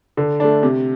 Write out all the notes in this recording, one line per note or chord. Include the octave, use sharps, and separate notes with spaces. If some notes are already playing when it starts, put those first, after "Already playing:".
D3
A3 D4
C3